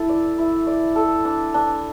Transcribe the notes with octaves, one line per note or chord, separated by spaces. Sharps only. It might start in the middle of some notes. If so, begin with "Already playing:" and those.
Already playing: E4 A4
D5
E4
D5
A4
D4
D4